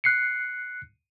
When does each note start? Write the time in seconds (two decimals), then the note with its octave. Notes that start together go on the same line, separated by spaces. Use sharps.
0.04 F#6 C7 C#7